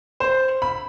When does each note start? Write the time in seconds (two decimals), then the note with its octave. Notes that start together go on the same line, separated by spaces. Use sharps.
0.20 C5
0.62 B5